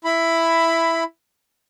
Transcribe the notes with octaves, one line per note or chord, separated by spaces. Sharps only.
E4 B5